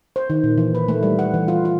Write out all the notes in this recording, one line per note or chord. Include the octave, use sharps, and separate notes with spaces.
C5
D#3
A#2
E3
B4
A3
G3
F#5
E3
F4
F4